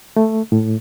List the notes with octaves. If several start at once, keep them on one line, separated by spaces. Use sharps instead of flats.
A3
A2